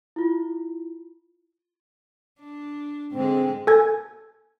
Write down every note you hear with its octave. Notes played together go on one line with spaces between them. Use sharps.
E4 F4
D4
G#2 D3 G#3 C4
A4 G#5 G#6